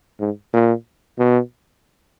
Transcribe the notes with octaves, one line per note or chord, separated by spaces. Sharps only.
G#2
A#2
B2